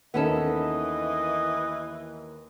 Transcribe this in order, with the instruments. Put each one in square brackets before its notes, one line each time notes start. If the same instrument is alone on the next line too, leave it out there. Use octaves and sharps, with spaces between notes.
[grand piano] D#2 D#3 [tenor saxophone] E3 [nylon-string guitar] B3 C#4 A4 [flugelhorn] D#5